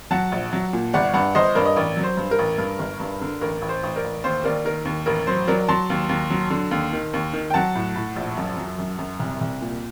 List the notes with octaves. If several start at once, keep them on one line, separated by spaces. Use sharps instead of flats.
F#3 F#5 A5
A#1
F#3
A#2
G1 D5 F#5
G2 D5 F#5
G1 C5 D#5
G2 A#4 D5
D#5
A1 A#4 D5
F#3
C5
G2
A#4
A1
G2
G1
G2
D3
A1 A#4
A1
C5
A1
A#4 D5
A1
D#2 C5
D#2 A#4 D5
D#3 A#4
D#2
A1 A#4
F#3 C5
F#3 A#4 D5
F#3 A5 C6
D#2
D#2
F#3
D3
D#2
D#3
D#2
D#3
G5
F#3 F#5 A5
A2
A2
A#1
F#2
F#3
F#2
F#2
C2
C2
A#2